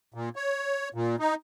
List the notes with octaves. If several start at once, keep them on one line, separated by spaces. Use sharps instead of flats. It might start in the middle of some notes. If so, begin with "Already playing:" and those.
A#2
C#5
A#2
D#4